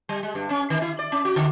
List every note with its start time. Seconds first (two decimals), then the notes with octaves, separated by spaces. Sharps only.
0.09 G3
0.23 G#3
0.35 G2
0.50 C#4
0.70 D#3
0.82 E4
0.99 D5
1.12 C#4
1.25 F#4
1.36 D3